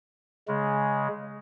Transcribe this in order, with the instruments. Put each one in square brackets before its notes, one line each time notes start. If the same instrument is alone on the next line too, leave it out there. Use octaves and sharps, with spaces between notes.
[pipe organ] C#3 G#3